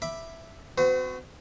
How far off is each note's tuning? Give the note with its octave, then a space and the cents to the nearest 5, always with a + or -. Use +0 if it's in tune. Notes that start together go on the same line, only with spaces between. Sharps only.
E5 +0 B5 +0 D6 +10
C4 -40 F#4 -10 C5 -45